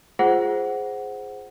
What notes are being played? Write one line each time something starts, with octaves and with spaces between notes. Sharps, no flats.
F4 G#4 C5 F#5